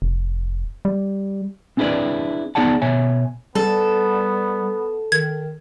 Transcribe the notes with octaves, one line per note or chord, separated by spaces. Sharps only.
F1
G3
C4 D4 E4 G#4 B4 D5
B3 D#4 G#4 D5 F#5 A5
B2 C#5 E5 G#5
G3 B3 A4
D#3 G#6